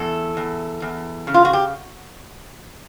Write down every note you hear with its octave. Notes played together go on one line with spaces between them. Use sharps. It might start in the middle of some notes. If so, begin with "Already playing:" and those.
Already playing: E2 A4
E2
E2
C#3
F4
F#4
G4